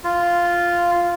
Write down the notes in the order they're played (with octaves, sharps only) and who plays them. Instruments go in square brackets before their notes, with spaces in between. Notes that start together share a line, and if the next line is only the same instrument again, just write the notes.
[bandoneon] F4